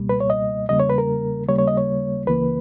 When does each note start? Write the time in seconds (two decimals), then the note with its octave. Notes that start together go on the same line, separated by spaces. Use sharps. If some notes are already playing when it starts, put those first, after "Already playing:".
Already playing: C#2 B2 G3 A#3
0.09 B4
0.20 C#5
0.30 D#5
0.69 E2 C#3 G3 A#3 D#5
0.80 C#5
0.89 B4
0.98 A#4
1.48 D#2 C#3 G3 A#3 C#5
1.58 C#5
1.67 D#5
1.77 C#5
2.27 C#2 C#3 E3 A#3 B4